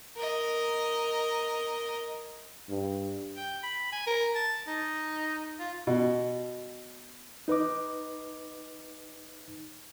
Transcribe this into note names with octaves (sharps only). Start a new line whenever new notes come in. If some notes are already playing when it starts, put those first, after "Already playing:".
A#4 D#5
G2
G5
B5
G#5
A#4
A5
D#4
F4
B2
D#4 B4 D#5 D6